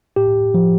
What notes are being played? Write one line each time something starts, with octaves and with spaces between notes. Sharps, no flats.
A2 G4
F3